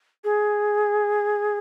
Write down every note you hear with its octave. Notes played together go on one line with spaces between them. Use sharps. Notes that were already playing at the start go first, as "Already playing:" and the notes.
G#4